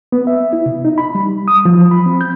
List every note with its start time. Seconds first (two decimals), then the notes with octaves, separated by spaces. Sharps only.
0.12 B3
0.27 E5
0.53 E4
0.66 C3
0.85 D#4
0.98 B5
1.15 G3
1.48 D#6
1.65 F3
1.91 B5
2.06 C4
2.21 G6